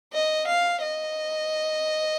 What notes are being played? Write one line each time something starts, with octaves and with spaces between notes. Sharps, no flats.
D#5
F5
D#5